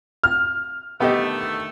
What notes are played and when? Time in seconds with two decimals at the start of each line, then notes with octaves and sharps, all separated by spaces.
0.24 F6
1.00 D3 D#3 A3 B3 G4 D#5